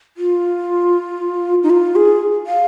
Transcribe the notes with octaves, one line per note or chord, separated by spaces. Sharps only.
F4
D#4
F4
G#4
F5